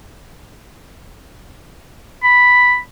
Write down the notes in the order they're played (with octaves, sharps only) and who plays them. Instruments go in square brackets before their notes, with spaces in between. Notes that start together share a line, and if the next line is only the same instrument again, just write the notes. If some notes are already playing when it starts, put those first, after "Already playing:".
[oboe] B5